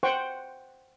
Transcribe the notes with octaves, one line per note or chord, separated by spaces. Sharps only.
C5 F#5 G5 C#6